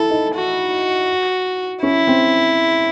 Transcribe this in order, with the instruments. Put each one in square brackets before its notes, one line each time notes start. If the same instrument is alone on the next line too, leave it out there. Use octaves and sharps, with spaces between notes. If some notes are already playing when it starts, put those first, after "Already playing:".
Already playing: [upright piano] E4 [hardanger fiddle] A4
[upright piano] D#4
[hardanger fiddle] F#4
[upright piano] C#4 [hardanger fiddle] E4
[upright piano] C4